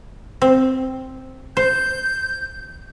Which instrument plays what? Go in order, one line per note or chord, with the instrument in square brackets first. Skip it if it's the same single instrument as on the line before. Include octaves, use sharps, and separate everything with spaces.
[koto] C4
[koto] C5 [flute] G6